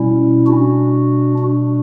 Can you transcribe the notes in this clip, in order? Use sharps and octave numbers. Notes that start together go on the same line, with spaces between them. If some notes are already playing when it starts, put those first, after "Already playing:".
Already playing: B2 G3 C#4 E4
D4 F#4
D4